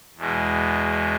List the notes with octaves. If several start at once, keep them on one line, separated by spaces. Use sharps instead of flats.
E2 B2 G#3